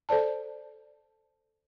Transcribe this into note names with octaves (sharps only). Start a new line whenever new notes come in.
A4 C5 D5 A5